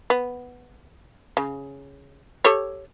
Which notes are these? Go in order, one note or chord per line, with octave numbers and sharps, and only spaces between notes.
B3
C#3
G4 A4 C#5